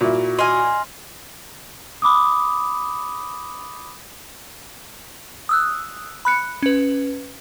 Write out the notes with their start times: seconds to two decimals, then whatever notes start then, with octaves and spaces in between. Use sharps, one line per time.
0.01 A#2 E4 F#4
0.39 D#5 G#5 C6 F6
2.02 B5 D6 D#6
5.49 D#6 E6 F#6
6.25 B5 F#6 C#7
6.63 C#4 B4